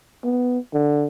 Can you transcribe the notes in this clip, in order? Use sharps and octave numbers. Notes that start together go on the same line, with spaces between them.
B3
D3